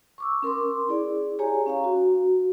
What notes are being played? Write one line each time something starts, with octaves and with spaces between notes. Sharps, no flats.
C#6 D6 E6
C#4 A#4 C6 D6
E4 G#4 D5
G4 G#4 C#5 G#5 A#5
C#4 F5 A#5
F#4